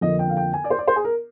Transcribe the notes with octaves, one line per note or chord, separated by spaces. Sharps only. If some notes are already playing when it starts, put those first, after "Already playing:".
F2 D3 F3 A#3 D#5
G5
F5
G5
G#5
D5
C5
D5
C5
G#4
A#4